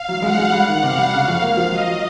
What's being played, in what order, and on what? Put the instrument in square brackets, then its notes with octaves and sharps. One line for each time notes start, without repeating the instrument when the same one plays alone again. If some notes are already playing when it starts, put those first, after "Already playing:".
Already playing: [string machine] F5
[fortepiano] F#3
[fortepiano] G#3 [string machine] F#5
[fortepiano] G#3
G3
D#3
[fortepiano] C3 [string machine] F5
[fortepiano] G3
C#3
F2
A#3
F3
[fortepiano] F#3 [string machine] D#5
[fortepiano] F#3